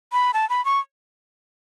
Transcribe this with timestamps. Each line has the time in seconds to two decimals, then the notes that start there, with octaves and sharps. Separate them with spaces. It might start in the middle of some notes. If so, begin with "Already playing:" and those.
0.12 B5
0.34 A5
0.50 B5
0.65 C#6